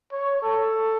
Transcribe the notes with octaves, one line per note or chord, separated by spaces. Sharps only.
C#5
A4